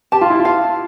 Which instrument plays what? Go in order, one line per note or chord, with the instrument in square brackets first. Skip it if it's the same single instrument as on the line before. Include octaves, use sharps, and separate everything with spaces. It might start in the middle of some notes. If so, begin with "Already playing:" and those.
[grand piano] G4 [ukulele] A5
[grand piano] F4
E4
F4
[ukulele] F5